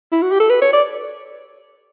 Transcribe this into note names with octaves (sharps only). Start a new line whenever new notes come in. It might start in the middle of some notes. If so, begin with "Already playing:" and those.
E4
F#4
G4
A4
B4
C#5
D5